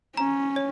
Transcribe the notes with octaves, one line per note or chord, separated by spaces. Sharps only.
C#4 A#5
C#5